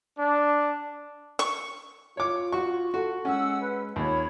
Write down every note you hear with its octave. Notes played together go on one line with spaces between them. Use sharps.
D4
C#6
F4 C#5 D6
F#4 C#6
F#4 A4
G#3 C#4 F#5 E6
B4
D#2 F4 C#5 B5